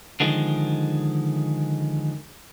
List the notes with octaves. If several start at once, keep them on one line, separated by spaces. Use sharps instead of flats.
D3 D#3 F3 G#3